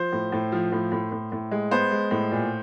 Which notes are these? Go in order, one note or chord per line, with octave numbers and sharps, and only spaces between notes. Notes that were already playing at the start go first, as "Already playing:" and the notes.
Already playing: F3 C5
A2
A2
F3
A2
A2
A2
A2
G#3
B3 C5
G#3
A2
A#2